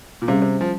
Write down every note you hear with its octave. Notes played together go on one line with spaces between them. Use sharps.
A#2
C3 G3 C#4 G#4 C5 F5
C3
F3